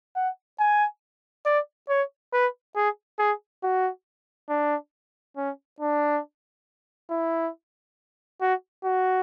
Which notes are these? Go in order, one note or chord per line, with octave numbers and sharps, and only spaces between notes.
F#5
G#5
D5
C#5
B4
G#4
G#4
F#4
D4
C#4
D4
E4
F#4
F#4